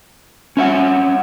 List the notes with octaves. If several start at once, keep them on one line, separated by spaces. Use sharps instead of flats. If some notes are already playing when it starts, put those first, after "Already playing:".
C#4 E5 F#5